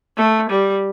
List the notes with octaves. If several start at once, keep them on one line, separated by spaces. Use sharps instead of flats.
A3
G3